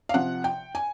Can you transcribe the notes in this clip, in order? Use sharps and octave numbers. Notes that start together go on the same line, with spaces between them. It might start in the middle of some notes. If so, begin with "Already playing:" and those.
F5
C3 F3 F#5
G5
G#5